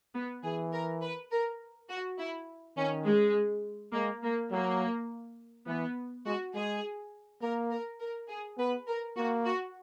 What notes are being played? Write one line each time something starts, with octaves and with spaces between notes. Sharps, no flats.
B3
E3 G#4
A#4
B4
A#4
F#4
E4
D#3 C#4
G#3
G#3 A#3
A#3
F#3 A#3
E3 B3
G#3 F#4
G#3 G#4
A#3 A#4
A#4
A#4
G#4
B3 B4
A#4
A#3 F#4
F#4